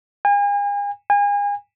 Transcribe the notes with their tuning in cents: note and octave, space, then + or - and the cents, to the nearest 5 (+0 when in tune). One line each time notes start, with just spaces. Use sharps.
G#5 -40
G#5 -35